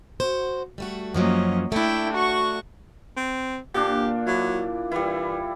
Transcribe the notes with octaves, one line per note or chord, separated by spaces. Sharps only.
F#4 C5
G3 A3 F#4
F#2 F3 F#3 A#3 C#4 D#5
A3 D4 E4 G5
F#4 F#5 C#6
C4
A#2 D4 G4
F#3 E4
E3 G3 E4